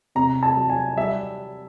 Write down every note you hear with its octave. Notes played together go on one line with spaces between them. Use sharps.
C3 A#5
A5
F#3
G#5
G3 E5